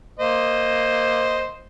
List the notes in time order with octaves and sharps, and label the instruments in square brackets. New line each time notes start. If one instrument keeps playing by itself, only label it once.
[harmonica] A#3 C5 D#5